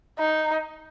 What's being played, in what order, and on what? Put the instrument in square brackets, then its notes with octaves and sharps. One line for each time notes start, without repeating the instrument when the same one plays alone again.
[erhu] D#4